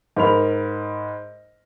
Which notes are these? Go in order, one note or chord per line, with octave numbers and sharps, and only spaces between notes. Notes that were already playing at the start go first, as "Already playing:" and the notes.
G#2 A#4 B5 F7